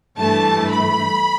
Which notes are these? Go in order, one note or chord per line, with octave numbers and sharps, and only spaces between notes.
G2 E3 A3 A5
B5